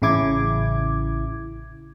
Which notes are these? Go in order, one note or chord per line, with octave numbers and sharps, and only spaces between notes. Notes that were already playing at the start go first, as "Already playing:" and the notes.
A1 C#3 E4 D6 G#6